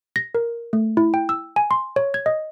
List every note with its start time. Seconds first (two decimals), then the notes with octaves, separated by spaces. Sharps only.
0.16 A#6
0.35 A#4
0.73 A3
0.97 E4
1.14 G5
1.29 E6
1.56 G#5
1.71 C6
1.96 C#5
2.14 G#6
2.26 D#5